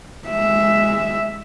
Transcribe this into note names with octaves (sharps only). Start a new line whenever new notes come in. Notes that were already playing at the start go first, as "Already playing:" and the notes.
G#3 E5